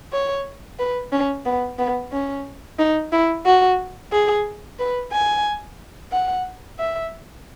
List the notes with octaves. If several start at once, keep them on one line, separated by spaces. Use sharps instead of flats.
C#5
B4
C#4
B3
B3
C#4
D#4
E4
F#4
G#4
B4
G#5
F#5
E5